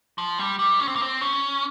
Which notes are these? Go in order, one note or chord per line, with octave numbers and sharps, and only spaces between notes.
F3
G3
G3
C#4
C4
A#3
C4
C#4